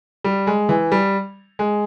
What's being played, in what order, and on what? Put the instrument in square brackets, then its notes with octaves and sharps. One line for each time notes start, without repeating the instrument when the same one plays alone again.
[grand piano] G3
G#3
E3
G3
G#3